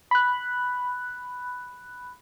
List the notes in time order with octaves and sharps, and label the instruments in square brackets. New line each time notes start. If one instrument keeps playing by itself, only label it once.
[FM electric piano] B5 F#6